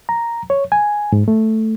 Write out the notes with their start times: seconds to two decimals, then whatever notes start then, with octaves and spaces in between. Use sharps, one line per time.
0.09 A#5
0.50 C#5
0.72 G#5
1.12 G#2
1.28 A3